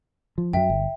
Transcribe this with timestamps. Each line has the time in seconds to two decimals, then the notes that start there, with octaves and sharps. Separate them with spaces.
0.38 F3
0.53 F#2 F#3 E5 G5
0.70 G1